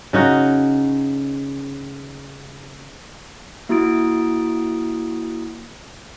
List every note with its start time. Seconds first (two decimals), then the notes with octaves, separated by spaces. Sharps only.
0.13 C#3 D#4 F#4
3.69 A#3 E4 F#4 D#6 A6 D7